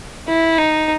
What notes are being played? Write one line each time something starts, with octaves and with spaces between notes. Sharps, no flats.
E4
D#4